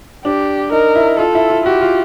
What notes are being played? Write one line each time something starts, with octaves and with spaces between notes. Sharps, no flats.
D4 G4
D#4 A#4
E4
F4 A4
E4
F4
F#4 G4
F4